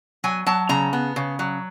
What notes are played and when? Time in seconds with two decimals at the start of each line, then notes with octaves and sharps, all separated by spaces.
0.24 F#3 G#5
0.46 F#3 A5
0.69 C#3 A#5
0.93 B3
1.16 C#3
1.39 F#3